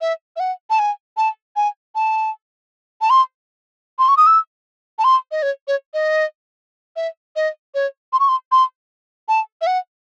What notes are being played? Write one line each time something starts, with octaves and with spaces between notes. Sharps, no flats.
E5
E5
F#5
A5
G#5
A5
G#5
A5
A5
C6
C6
C#6
D#6
E6
A5
C6
D#5
C#5
C#5
D#5
E5
D#5
C#5
C6
C#6
C6
C6
A5
E5
F#5